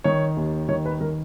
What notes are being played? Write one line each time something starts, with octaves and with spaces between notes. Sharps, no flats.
D#3 C#5
D#2
D#3 C#5
B4
D#3 A#4